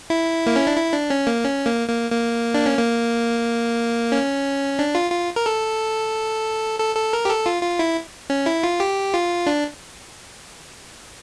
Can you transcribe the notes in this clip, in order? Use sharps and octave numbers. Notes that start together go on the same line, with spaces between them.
E4
A#3
C#4
D4
E4
D4
C#4
A#3
C#4
A#3
A#3
A#3
D4
C#4
A#3
C#4
D4
F4
F4
A#4
A4
A4
A4
A#4
G4
A4
F4
F4
E4
C#4
E4
F4
G4
F4
D4